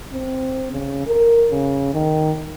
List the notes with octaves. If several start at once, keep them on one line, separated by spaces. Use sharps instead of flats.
C4
C#3
A#4
C#3
D#3